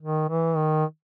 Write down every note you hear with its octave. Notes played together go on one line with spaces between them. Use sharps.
D#3
E3
D#3